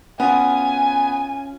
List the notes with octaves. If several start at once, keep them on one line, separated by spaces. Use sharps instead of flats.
B3 C#4 F4 G#5